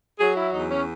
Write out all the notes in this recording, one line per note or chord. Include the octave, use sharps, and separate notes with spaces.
F#3 G#4
E4
E2 D#4
C#4